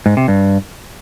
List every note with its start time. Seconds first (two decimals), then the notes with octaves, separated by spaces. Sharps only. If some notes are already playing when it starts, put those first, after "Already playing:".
0.06 G#2
0.17 C3
0.28 G2